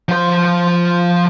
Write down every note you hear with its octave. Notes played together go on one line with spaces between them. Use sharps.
F3 C5